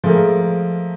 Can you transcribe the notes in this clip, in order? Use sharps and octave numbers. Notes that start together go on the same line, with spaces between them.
F3 G#3 A3 G#4 A#4